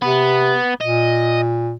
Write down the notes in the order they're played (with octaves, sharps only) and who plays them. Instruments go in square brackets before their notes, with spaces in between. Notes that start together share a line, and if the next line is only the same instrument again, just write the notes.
[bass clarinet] C3 [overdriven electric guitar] B3
[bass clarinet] A#2 [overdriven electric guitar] D#5